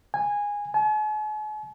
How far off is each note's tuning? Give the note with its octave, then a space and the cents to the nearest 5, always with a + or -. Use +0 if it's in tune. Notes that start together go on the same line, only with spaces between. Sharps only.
G#5 -15
G#5 +45